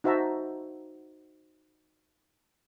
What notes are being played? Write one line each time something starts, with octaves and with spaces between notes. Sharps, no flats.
D#4 F#4 C5 E5 A5 A#5